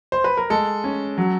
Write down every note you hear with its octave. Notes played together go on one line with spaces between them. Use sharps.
C5
B4
A#4
G#3 A4
C#4
F#3